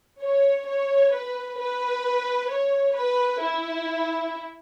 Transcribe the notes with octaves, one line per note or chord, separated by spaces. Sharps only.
C#5
C#5
B4
B4
C#5
B4
E4